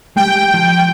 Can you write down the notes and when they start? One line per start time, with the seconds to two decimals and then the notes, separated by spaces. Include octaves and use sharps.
0.17 G3 G#3 G5
0.54 F3